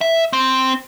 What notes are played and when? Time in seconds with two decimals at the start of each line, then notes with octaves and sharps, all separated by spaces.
0.01 E5
0.33 C4